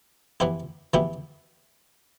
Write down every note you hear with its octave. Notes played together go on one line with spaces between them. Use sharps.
E3 B3 E4 G4
E3 B3 E4 G4